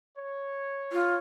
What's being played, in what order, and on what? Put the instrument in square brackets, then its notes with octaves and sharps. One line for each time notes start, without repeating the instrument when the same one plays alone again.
[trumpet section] C#5
[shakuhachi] F4